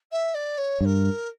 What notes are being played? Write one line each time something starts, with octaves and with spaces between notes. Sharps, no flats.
E5
D5
C#5
G2 A#4 C#5